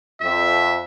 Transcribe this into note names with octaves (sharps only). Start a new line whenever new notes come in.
F2 E5